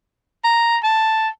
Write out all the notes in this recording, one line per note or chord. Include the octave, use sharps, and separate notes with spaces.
A#5
A5